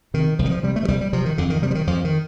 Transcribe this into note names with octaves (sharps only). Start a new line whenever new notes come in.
C3 D#3
C2 F3
D#3
F3
C3 G3
A3
F3
C2 G3
G3
C3 F3
D#3
F2 D3
D#3
C3 G3
F3
D#3
F2 F3
D#3